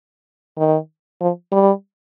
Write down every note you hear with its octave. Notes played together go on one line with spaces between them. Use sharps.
D#3
F3
G3